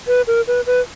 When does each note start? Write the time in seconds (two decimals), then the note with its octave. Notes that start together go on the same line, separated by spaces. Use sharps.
0.08 B4
0.27 A#4
0.47 B4
0.66 B4